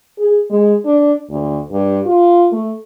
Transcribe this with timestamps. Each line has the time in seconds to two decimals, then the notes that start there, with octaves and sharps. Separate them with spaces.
0.18 G#4
0.50 G#3
0.85 D4
1.30 D2
1.71 G2
2.06 F4
2.52 A3